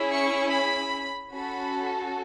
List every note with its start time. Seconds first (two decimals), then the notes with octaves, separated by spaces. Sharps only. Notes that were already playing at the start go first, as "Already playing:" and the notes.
Already playing: C#4 E4 G#4
0.11 C#6
0.51 B5
1.31 C#4 F#4 A4 B5